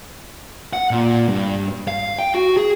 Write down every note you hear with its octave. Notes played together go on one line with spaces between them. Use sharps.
F#5
A#2
G2
F5
G5
F#4
G#4